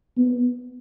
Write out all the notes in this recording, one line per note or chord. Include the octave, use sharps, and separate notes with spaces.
B3